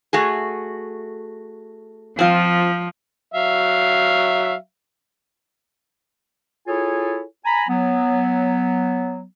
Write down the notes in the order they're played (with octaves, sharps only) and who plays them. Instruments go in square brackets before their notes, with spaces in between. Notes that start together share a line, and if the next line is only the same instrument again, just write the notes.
[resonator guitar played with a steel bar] A3 F#4 G#4
[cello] F3 [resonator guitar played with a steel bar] C4 F4
[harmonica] F#3 E5 F5
[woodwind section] E4 F4 G#4 A4 C#5 G#5
G#5 A#5 B5
F#3 B3